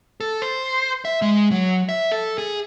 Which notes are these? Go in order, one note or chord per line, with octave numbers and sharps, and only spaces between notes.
A4
C5
E5
G#3
F#3
E5
A4
G#4